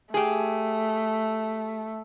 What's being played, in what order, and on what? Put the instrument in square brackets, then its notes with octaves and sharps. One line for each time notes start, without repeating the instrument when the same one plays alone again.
[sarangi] A3 [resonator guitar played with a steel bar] G4 G#4